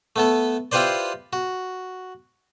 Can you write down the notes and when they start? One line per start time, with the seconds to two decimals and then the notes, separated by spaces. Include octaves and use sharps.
0.16 A3 B3 A4
0.72 E4 F4 G4 B4 C5 D5
1.33 F#4